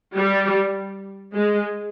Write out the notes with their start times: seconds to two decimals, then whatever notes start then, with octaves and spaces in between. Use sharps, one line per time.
0.15 G3
1.33 G#3